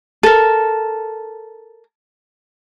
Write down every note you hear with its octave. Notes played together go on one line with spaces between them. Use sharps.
A4 A#4